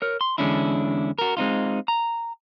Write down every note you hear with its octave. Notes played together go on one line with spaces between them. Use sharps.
A#4 C#5
C6
E2 D3 G#3 C#4 D4 E4
F#4 A#4
G#3 C4 D#4 F4
A#5